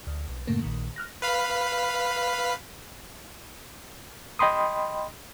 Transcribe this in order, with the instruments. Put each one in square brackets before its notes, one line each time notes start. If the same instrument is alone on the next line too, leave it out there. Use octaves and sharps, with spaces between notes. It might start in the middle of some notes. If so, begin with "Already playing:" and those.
[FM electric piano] D2
B1
F#2 A2 C#3 A3 A#3
A#1 A#2 D#3
F6 F#6 A#6
[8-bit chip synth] B4 F5 B5
[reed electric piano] D#5 G5 B5 C6 D#6